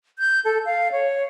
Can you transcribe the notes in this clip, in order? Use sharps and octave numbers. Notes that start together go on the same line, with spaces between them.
G6
A4
F5
C#5